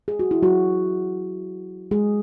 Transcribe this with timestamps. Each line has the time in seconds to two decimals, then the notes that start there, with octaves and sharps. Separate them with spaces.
0.08 G#4
0.19 F#4
0.31 E4
0.42 F#3 F#4
1.91 G#3 G#4